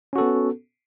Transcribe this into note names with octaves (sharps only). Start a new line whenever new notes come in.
B3 C#4 F#4 A4